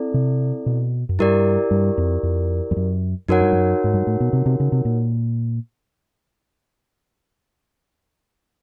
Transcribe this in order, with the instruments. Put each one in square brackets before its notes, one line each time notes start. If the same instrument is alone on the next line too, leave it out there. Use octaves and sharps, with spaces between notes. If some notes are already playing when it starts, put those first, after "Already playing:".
Already playing: [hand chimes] C4 E4 A4 D5
[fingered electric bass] C3
B2
F#2
[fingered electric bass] G2 [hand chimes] E4 G4 A#4 D5
[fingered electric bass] G2
F2
F2
F2
F#2
[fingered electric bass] F#2 [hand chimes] D#4 F#4 A#4 C#5 F#5
[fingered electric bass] G2
F#2
G#2
G2
A2
B2
C3
C3
C#3
C3
A#2